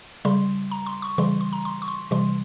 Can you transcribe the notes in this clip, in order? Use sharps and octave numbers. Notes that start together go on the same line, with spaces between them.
C#3 G3 C6
A#5
C6
C#6
C#3 E3 G3 C6
C6
A#5
C6
C#6
C6
C3 E3 G3 C6